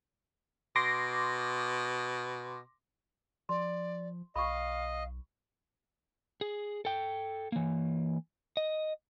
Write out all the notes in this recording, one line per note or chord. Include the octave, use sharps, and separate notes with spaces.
B2 C6 D6 A#6
F3 D5 C6
B1 D#5 F5 B5 C#6
G#4
A4 G5
E3 A#3
D#5